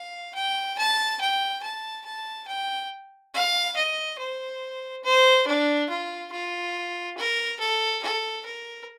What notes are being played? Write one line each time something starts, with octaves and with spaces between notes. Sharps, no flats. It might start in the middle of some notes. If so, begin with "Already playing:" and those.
Already playing: F5
G5
A5
G5
A5
A5
G5
F5
D#5
C5
C5
D4
F4
F4
A#4
A4
A4
A#4